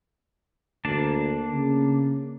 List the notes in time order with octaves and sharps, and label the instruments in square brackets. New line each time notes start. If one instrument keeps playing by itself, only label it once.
[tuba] D2 [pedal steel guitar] A#3 D4 A5
[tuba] C#3